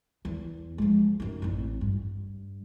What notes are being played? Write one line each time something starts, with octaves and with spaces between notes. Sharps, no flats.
E2
F3 G#3
F#2 D#4
A1 C4
G2